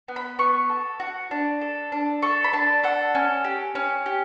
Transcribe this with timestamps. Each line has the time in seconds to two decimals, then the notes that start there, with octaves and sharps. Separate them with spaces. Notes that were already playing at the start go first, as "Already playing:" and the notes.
0.08 B3
0.16 B5
0.39 B3 C#6
0.69 A4
1.00 F#4
1.31 D4
1.61 A4
1.92 D4
2.22 A4 C#6
2.44 B5
2.53 D4 A5
2.83 A4 F#5
3.15 C#4
3.44 G4
3.75 C#4
4.06 G4